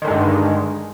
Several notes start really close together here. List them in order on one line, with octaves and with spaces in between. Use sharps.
D#3 D3 G#3 G2